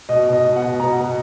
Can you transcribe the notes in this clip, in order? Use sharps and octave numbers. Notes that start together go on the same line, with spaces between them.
B2 D#5
B2
D#5
B2
F#5
B2
B2 A#5
B2